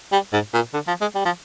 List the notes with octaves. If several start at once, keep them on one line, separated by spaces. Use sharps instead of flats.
G3
G#2
A#2
D3
F3
G#3
G3
F3